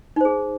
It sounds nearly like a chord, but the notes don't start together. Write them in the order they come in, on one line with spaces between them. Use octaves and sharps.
D#4 C5 G#4